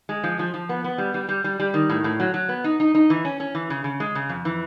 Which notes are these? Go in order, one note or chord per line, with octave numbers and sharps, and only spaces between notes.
G#3
F3
F3
F3
B3
B3
G3
G3
G3
G3
G3
D#3
A2
A2
F#3
F#3
B3
D#4
D#4
D#4
E3
C#4
C#4
E3
C#3
C#3
G#3
C#3
F2
E3